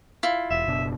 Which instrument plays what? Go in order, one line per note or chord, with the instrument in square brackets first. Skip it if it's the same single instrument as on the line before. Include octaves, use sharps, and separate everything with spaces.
[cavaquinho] E4 F4
[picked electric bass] E1 [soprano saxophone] E5
[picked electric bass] F#1 B2 D4